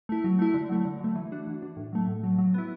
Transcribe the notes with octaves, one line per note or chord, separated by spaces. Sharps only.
A3 E4
F#3
A3 E4
D3
F#3 A3
D3
F#3 A3
E3
D4 F#4
E3
D4 F#4
A2
F#3 A3
A2
F#3 A3
F#3
B3 E4